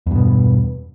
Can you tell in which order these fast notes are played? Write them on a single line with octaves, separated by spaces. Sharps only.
E2 G2 B2